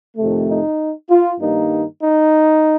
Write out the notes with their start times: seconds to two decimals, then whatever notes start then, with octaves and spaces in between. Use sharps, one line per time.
0.16 F2 C3 D#3 A3
0.48 D#4
1.10 F4
1.40 G2 D#3 G3 A#3 D#4
2.02 D#4